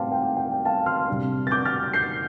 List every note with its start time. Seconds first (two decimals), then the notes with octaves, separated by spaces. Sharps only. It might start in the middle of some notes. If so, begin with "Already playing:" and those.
Already playing: A2 G3 C4 F5 G5 A5 C6 D6
0.12 G5
0.22 G5
0.37 G5
0.51 G5
0.65 F5 A5
0.86 C6 F6
1.08 C3 G3 D4
1.47 A6
1.51 D6 G6
1.65 F6 A6
1.93 G6 C7